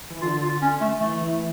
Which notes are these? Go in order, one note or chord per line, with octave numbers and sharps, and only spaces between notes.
E3
D3 F4
F4
C#4
A3
E3 A3